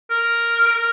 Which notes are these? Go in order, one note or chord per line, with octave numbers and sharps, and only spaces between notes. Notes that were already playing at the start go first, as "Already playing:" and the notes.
A#4
A#4